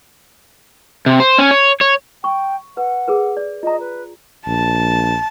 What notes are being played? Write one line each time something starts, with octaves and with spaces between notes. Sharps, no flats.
C3
C5
C#4
C#5
C#5
G5 C#6
B4 F#5
G#4 A#4 B4
D5
F4 D#5 A#5
B4
A#1 A5